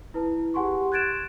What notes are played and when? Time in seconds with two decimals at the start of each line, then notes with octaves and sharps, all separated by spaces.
0.14 E4 B4 A5
0.54 G4 G#4 F#5 G#5 C6 C#6
0.92 F#6 G#6 A6 D7 E7